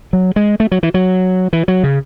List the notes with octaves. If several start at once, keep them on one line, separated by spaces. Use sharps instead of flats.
F#3
G#3
A3
F#3
E3
F#3
E3
F#3
C#3